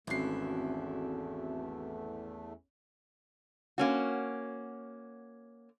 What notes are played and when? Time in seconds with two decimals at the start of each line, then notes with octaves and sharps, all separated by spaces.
0.07 G#1 E2 A3 C4 C#4 E4 F#4 C7
3.78 A#3 C#4 F#4